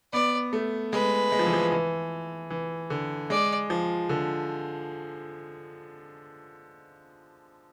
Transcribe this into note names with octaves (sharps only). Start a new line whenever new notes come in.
B3 D5
A3
G#3 B4
G#3
F3
E3
F3
E3
E3
D3
G#3 D5
F3
D3